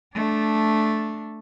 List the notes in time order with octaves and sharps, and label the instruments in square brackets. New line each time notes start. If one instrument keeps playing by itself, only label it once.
[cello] A3 D4